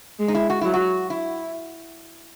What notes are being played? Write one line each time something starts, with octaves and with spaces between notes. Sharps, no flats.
G#3
D#4
E4
F#4
F#3 E4
F#4
E4